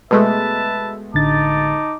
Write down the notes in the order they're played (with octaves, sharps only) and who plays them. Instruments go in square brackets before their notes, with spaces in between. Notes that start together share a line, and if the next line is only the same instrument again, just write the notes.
[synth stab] B2 G#3 A3 [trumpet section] B4 E5 A5
[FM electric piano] A1 D3 A6 [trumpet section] D#4 A5 D6